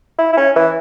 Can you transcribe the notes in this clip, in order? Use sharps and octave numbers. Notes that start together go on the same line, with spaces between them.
E4
E4
C#4
E3